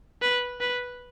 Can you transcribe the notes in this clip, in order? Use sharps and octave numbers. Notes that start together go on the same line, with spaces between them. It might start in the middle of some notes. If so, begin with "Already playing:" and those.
B4
B4